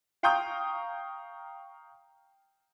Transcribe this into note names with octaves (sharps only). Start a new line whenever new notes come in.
F5 G5 A#5 C#6 D#6 G6